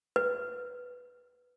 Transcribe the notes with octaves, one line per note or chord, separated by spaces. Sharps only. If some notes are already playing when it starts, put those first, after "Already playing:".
B4